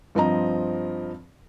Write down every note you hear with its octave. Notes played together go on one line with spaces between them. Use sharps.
G2 F3 C4 D#5 A#5